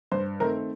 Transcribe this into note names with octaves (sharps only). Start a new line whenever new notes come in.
G2 C5
D#3 A3 C4 A#4